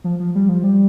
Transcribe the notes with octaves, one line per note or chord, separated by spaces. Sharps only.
F3
F3
G3
F3
G3